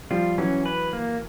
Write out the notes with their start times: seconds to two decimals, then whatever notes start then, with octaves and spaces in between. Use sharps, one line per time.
0.11 F3 G3 F4
0.38 E3 F#3 C#4
0.66 B4
0.93 A#3